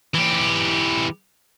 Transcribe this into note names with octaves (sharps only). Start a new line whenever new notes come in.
E3 G4